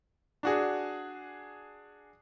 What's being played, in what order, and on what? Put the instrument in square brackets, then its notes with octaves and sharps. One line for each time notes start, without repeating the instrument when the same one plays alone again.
[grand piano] D4 F#4 G#4